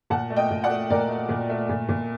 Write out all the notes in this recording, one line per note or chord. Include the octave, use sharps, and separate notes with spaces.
A#2 F#5 A5
A3
D#5 G5
A#2
D5 F#5
A3
A#2 A#4 D5
A3
A#2
A3
A#2
A#2